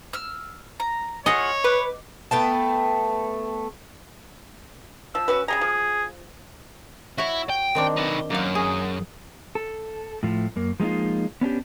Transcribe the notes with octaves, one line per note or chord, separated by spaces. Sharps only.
E6 F6
A#5
F4 G#4 C#5 D#5 F#5
B4 D6
A3 B3 G5 A5
F3 E6
C#4 F#4 B4
C#3 G3 G#4 A#5
F3
E4 F#4 C#5
G5
D#3 C4 D4
D#4 B4
F#2 A#3 F5
G#4
A4
A2 F3 A3
F#2 A#3
F3 G#3 A#3 D#4 F4
B3 C#4 D4 G4